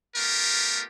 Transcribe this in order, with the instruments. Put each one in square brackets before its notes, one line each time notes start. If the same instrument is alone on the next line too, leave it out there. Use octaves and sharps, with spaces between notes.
[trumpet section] A3 B3 F4 G4 A#4